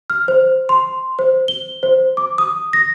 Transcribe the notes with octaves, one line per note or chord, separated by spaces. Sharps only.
F6
C5
C6
C5
G7
C5
D6
D#6
A#6